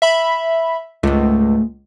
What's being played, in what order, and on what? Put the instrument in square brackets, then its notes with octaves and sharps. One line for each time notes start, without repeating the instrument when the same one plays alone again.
[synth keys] E5 B5
[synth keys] C#2 [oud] G#2 A3